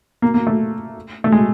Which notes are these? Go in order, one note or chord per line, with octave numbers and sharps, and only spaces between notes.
A#3
A#3
A3
A3
G#3